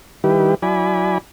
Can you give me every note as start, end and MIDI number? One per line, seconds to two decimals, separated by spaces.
0.24 0.55 51
0.24 0.55 55
0.24 0.55 64
0.24 0.55 67
0.24 0.55 71
0.62 1.18 54
0.62 1.18 64
0.62 1.18 74
0.62 1.18 80
0.62 1.18 83